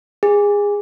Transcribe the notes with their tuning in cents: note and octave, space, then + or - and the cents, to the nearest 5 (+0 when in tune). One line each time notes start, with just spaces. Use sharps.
G#4 -20